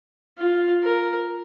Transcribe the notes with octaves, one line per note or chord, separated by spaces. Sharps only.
F4
A#4